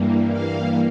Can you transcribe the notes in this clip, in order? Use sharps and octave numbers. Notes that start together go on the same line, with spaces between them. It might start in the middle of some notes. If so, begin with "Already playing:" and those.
Already playing: G2 E3 G3 A#3
F5